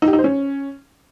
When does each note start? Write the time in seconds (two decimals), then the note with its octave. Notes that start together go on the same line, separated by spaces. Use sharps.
0.02 D#4
0.08 G4
0.13 D#4
0.19 C5
0.24 C#4